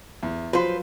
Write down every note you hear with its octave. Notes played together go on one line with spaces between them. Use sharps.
E2
F3 F#3 F4 B4 C5